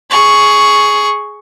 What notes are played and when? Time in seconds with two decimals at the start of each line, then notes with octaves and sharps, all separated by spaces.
0.11 G#4 C#6